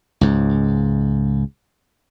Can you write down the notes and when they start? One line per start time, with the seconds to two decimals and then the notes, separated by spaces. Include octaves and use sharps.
0.21 C#2 G#2